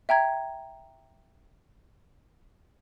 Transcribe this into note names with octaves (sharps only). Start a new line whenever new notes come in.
E5 G5 A#5 G#6